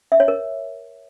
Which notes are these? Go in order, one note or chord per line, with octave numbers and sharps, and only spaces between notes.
E5
C#5
A#4